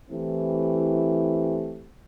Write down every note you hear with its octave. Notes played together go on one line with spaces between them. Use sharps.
E3 A3 C4 E4 G4